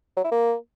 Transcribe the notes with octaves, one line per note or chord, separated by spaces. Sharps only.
F#3
E4
A#3